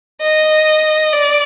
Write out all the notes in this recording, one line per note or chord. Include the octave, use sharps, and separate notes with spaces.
D#5
D5